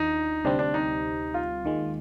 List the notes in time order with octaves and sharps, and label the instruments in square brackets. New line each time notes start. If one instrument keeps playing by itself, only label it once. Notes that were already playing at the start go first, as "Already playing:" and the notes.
Already playing: [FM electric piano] D#2 D#3 D4 F4 [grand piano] D#4
[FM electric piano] D2 C3 G3 C4 [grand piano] D4
[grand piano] D4
D#4
F4
[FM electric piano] D#2 D#3 G#3